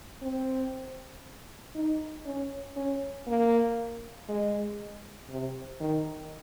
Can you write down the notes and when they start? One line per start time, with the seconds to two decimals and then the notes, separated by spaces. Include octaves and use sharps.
0.22 C4
1.75 D#4
2.25 C#4
2.76 C#4
3.28 A#3
4.29 G#3
5.30 C3
5.80 D#3